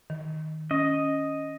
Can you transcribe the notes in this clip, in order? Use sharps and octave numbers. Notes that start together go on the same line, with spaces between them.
D#3
C#4 D#5 A#6